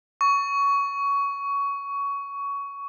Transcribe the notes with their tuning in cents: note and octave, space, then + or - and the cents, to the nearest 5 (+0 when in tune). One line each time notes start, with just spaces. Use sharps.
C#6 +20